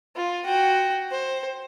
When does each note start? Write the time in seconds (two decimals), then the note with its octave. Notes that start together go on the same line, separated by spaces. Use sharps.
0.16 F4
0.46 F#4 G5
1.11 C5